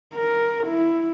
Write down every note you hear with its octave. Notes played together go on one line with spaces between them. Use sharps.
A#4
E4